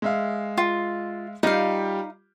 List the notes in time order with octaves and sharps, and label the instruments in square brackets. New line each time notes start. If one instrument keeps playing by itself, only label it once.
[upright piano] G#3 E5 F5
[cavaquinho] F4
[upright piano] G3 F4 G4 [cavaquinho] D#4 F5